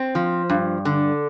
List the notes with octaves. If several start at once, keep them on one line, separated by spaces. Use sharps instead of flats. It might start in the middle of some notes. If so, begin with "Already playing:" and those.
Already playing: C4
F3
G2
D3